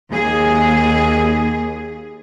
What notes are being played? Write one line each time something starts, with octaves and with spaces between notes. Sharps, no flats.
D#2 G#4